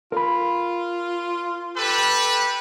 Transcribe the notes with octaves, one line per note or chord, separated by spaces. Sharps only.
F4 A#4 B5
G4 A4 B4